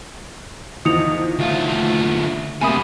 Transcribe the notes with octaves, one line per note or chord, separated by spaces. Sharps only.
E2 D#3 F3 D#5 D#6 C#7 F7
D2 A3 F4
F#2 C3 A3 A#3 G#5 B5 D#6